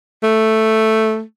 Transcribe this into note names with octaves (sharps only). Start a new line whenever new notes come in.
A3